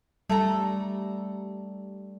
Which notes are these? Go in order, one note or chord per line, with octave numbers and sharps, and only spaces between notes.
G3 A3 A4 A#5